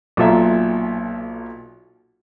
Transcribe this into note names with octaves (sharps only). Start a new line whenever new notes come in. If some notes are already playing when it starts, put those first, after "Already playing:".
B1 A#2 F4 A4 E5 A#5